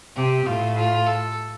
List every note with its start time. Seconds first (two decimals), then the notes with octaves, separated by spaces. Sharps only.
0.16 C3 G4
0.46 A2 F4
0.77 F4
1.07 A4